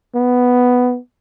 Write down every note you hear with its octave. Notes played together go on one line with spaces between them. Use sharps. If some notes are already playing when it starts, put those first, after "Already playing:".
B3